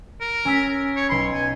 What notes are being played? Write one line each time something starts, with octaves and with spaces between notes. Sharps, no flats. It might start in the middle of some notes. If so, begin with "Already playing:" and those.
A#4
C#4 E6 B6
C#5
B1 B5 C6
G#5